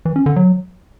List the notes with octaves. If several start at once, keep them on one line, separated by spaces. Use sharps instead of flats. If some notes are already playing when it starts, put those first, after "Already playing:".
E3
C#4
D3
F#3